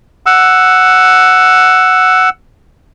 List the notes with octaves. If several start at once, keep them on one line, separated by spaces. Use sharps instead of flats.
F#5 E6